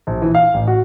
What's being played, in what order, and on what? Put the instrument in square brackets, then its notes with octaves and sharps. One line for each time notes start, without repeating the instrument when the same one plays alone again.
[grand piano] A#1
E3
F5
A1
F#4